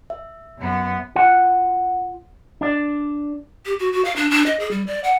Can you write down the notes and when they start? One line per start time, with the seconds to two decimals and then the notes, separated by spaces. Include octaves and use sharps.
0.10 E5
0.59 F#2 B3
1.15 F4 F#5
2.61 D4 D5
3.66 G4
3.79 F#4
3.92 F#4
4.05 F5
4.16 D4
4.30 D4
4.46 D#5
4.60 G#4
4.71 G3
4.87 D5
5.04 F#5